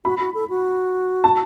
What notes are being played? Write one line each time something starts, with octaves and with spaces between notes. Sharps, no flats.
F#4 B5
F#4
A4
F#4
A5